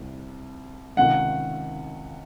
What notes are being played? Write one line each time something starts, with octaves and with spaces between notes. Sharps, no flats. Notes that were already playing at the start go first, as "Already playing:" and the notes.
Already playing: C2 C3
C#2 C3 D#3 F#5